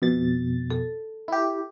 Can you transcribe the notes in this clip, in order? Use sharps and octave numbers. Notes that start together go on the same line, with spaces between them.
F2 B2 A6
A4
E4 G4